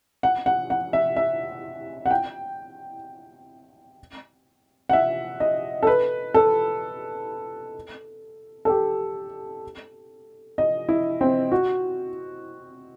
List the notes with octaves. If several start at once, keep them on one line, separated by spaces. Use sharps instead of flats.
F#5
F#5
F#5
E5
E5
F#5
G5
F#5
E5
D#5
A4
B4
A4
A4
G4
D#5
E4
C4
F#4